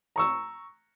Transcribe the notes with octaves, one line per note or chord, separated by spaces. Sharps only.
A#5 C#6 E6